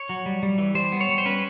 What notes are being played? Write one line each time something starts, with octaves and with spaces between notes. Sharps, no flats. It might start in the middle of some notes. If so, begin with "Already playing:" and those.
Already playing: C#5
F#3
G3
G3
E3
G3 C5
B3
C#5
G3
C5
C#4 B4